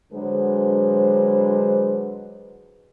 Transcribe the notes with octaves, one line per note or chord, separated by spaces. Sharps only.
D3 F#3 G#3 B4 C5